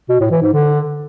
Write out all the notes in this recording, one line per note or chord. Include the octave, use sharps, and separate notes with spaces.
B2
A2
E3
G#2
D3